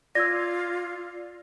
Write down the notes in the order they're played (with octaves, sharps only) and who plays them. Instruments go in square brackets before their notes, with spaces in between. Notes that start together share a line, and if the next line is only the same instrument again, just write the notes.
[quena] F4 [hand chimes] D5 [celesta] E6 G#6 A#6